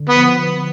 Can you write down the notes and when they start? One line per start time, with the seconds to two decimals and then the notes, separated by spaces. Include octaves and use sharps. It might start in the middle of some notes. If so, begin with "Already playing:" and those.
Already playing: D3
0.09 B3
0.15 F3